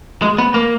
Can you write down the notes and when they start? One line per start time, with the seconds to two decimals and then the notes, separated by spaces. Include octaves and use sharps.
0.22 G#3
0.38 B3
0.54 A#3